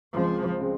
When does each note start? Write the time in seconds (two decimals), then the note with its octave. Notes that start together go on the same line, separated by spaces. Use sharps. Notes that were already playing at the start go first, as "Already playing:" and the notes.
0.14 C#2 C#3 F3 G#3 C4
0.61 C#3 G#3 C4